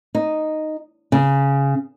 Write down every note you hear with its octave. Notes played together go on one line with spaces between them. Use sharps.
D#4
C#3